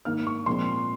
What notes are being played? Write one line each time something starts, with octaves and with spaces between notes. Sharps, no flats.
G#2 D#3 A#3 F6
C#6
A#2 F3 G#3 C4 C6